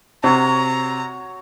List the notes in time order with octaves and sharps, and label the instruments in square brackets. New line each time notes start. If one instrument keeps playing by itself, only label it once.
[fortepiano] C3 [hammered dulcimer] F#4 C#5 [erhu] A#5